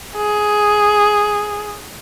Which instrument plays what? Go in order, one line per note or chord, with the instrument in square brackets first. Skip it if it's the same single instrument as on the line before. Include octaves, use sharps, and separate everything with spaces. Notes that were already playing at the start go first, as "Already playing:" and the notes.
[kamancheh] G#4